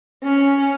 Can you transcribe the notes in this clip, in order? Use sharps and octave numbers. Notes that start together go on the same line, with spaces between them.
C#4